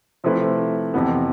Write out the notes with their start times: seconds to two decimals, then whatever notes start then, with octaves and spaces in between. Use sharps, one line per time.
0.24 C3 F3 A3 E4 B4
0.94 F2 C3 E3 B3